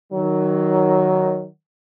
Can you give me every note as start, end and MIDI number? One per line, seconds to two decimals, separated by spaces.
0.12 1.46 51
0.12 1.46 54